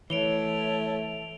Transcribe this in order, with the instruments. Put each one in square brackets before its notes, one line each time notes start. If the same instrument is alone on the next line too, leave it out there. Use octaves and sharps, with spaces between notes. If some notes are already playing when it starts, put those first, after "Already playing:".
[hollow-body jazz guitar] E3 [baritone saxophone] A3 [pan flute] C#5 [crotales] D7 F7 G7